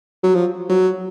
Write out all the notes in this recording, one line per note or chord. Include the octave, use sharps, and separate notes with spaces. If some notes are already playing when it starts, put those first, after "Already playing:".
F#3
F3
F#3